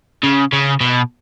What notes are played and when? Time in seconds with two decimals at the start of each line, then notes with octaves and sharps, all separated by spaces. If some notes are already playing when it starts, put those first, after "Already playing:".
0.23 C#3
0.52 C#3
0.81 B2